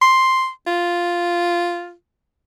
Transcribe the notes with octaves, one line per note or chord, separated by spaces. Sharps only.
C6
F4